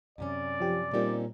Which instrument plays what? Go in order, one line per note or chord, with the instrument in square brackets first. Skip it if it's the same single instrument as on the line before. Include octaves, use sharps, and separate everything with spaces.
[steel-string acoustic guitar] F#2 C3 C#4 [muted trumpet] D5
[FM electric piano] F3 G4
[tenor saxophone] A#2 [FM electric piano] G3 [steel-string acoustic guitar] C4 C#4 D#4